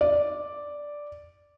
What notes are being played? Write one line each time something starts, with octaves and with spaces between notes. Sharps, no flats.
D5